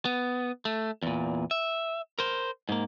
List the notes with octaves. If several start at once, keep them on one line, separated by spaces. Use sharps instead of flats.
B3
A3
E2 A#2
E5
A#4 C5
G#2 A#3